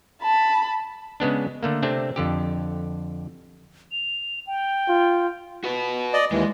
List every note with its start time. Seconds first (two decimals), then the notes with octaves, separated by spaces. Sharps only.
0.22 A5 B5
1.20 C#3 G#3 B3 D4
1.63 D3 A3 A#3
1.83 C3 A3 C4 D4
2.16 F2 D3 G4
3.92 F7
4.47 G5
4.88 F4
5.64 F#4 B4
6.13 D5 D#5
6.32 D#2 E3 G#3